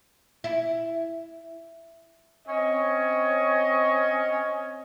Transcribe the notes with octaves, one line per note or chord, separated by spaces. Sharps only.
E4
C4 C#4 C#5 D#5